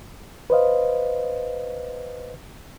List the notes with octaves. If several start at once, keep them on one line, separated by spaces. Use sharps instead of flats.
B4 C5 D#5 F5